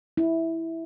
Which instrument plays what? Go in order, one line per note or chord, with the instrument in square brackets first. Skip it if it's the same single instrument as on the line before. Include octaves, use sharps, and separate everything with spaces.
[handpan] E4